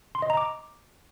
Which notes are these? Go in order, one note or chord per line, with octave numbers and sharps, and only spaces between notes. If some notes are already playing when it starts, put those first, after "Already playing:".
C6
D#5
A#5
D6